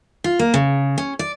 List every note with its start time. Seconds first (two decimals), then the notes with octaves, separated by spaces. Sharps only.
0.24 F4
0.39 A#3
0.54 C#3
0.98 C#4
1.19 D5